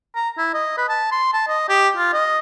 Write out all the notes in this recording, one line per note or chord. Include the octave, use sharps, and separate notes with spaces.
A#5
E4
D#5
B4
A5
C6
A5
D#5
G4
F4
D#5